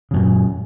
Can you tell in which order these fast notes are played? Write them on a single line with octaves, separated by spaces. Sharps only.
C#3 F#2 A#2